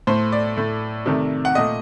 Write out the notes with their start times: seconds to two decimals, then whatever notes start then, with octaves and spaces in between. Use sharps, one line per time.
0.07 A2 A3 C5
0.32 D5
0.56 A2 A3
1.06 C3 D#3 A3
1.45 F#5
1.55 A#2 A3 D#5